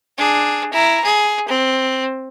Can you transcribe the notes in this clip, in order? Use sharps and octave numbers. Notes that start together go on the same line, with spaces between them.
D4 G#4
E4 A#5
G#4
C4